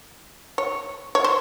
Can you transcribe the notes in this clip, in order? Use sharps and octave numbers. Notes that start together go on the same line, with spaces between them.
C#5
C#5
C5